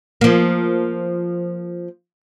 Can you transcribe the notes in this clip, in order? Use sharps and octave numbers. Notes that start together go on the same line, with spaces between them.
F3 A#3